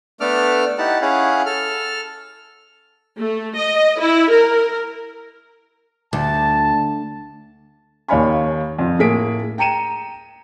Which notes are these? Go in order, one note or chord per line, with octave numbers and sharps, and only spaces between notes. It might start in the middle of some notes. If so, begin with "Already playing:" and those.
A3 B3 D4 A4 D6 F6
D#4 E4 G4 F#5 A5
C#4 E4 G#4 F5 F#5
A4 F6
A3
D#5
E4
A#4
D2 A5
D#2 D#3 C#5 F5 G#5 B5
F2
A2 A#3 G#4 B6 D7
G5 A#5 C#7 D#7 E7